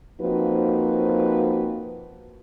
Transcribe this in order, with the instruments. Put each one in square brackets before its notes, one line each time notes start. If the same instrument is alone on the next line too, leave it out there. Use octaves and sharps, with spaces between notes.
[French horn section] F3 A#3 C4 D#4 F#4 B4